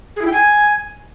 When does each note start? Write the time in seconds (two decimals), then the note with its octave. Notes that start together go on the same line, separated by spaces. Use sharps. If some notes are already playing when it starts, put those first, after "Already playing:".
0.16 G#4
0.22 E4
0.27 G5
0.32 G#5